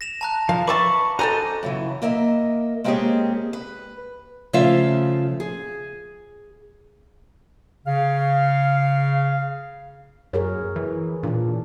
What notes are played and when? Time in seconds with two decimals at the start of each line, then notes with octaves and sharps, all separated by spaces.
0.01 A#6 E7 F7
0.21 A5 A#5 F#6
0.49 F3 F5
0.67 B4 E5 A5 B5 C#6 D6
1.19 F#4 A4 C5 D#5 G#5 A#5 D#7
1.63 F#2 C#3 E3
2.02 A#3 A#4 D#5 E5
2.84 G#3 A#3 C4 C#4 G4 G#4
3.53 B4
4.53 C#3 F3 A3 F4 E5 F5
5.40 G#4
7.86 C#3 F5
10.33 F#2 G#4 A#4 C#5
10.76 E3
11.23 A#2 E3 D4